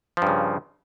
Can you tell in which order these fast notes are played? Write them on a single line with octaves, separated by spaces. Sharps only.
F3 G2 C#3